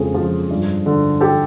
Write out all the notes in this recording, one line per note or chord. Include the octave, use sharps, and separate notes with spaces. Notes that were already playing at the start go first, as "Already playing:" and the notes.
Already playing: F2 C#3 G#3 G#4
F3
G2
D3
G4 A4